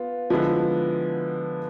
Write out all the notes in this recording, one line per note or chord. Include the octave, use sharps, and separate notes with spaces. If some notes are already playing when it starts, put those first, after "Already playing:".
Already playing: B3 F4
D3 F3 G#3 B3 E4